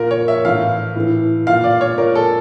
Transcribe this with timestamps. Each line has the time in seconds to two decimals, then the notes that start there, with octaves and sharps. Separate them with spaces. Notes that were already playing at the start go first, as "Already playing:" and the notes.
Already playing: A#2 A#4
0.11 C#5
0.28 E5
0.45 A2 E3 F5
0.96 A2 E3
1.47 A#2 F5
1.64 D5
1.81 C#5
1.98 A#2 A#4
2.15 A4